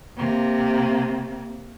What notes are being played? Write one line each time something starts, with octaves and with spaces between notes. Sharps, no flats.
C3 A#3